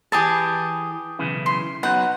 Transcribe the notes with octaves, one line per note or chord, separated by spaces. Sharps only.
E3 G4 G#4 G#5 A5
B1 C#3 E3
C6
F#3 B3 D#4 F#5